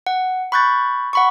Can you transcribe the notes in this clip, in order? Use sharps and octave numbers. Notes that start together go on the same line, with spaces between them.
F#5
B5 C#6 F#6 G6 A6
F#5 B5 C#6